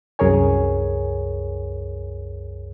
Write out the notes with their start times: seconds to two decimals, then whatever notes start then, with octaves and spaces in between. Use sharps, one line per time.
0.19 C2 F#2 G#4 A#4 C#5 G#5